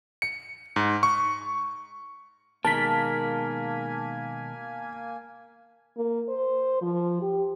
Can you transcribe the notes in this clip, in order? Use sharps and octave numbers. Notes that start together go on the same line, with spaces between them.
C#7
G#2
C#6
B2 D#3 G#3 A#3 A#4 G#5 A5 B6
A#3
C5
F3
G4